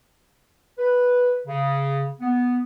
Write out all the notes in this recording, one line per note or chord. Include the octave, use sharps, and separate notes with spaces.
B4
C#3
B3